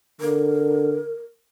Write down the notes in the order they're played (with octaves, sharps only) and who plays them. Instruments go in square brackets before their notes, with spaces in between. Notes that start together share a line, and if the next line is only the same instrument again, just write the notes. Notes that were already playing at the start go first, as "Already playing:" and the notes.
[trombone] D3 [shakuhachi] A#4